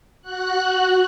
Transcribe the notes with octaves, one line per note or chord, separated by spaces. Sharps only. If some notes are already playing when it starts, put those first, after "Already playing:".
F#4 F#6